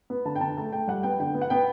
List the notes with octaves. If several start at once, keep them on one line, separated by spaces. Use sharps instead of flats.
B3
D3 A5
G5
D3 A5
A3 A5
A3 G5
G3 F#5
B3 G5
D3 G5
B3
F#5
B3 G5